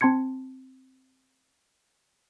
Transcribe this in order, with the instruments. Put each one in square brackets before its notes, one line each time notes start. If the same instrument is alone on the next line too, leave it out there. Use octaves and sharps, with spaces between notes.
[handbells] C4 A5 C6 G#6 C#7